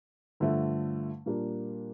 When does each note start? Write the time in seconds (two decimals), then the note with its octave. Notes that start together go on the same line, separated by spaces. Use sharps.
0.40 G2 D3 F3 A3
1.26 A#2 G3 A#3 D4